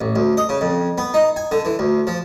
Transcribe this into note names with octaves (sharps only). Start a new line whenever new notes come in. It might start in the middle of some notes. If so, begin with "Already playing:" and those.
A1
D2
D#5
C#3
F2
B3
D#4
G#5
D3
E3
D2
F3